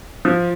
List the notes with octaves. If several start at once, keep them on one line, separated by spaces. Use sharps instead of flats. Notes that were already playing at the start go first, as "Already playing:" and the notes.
F3